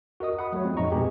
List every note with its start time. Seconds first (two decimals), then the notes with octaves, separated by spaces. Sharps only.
0.20 F#4 A#4 D#5 D#6
0.38 F#5 B5 D#6
0.52 F#3 A3 F#4 C#5
0.65 F3 G#3 C4
0.77 F2 A#2 D#4 D#5 A#5 C#6
0.91 B2 G#3 B3 C4 G4 G#4